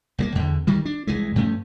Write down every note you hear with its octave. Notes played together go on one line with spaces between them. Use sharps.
C2 F#3 A#3
E2 D3
G2 D#3 G3
D4
C2 E3 G#3
G2 F3 A3 C#4